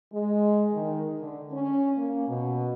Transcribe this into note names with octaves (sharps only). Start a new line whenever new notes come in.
G#3
D#3
D3
C#4
A#3
B2